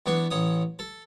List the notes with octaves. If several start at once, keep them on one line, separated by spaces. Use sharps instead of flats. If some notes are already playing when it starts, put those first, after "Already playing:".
E2 B3 D4 C#6
A1 C#4 D#6
A4